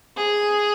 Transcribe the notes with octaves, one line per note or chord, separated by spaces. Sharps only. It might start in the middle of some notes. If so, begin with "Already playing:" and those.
G#4